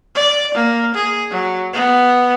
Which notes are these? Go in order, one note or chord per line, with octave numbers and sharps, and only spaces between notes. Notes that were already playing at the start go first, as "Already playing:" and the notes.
D5
A#3
G#4
F#3
B3